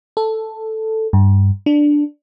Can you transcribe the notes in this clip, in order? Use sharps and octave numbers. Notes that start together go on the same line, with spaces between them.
A4
G2
D4